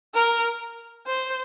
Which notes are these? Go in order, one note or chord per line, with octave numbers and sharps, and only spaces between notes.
A#4
C5